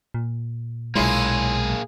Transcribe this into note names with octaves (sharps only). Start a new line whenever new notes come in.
A#2
B1 G#3 A#3 C#4 E4 F4 G#4